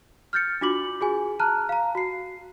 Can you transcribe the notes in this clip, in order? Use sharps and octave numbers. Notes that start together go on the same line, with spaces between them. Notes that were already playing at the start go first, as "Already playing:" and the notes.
F6 G6 A6 C#7
D4 F4 F#4 D6 F#7
F#4 G#4 G#5
A5 A#5 F6 F#6
F5 A#5
F#4 C7